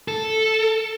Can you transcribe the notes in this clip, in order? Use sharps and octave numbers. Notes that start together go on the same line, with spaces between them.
A4